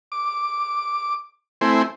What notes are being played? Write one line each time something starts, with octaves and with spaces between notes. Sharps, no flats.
D6
A3 C4 E4 G#5 C6